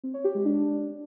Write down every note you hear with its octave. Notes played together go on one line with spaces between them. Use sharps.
C4
C#5
G4
G#3
D4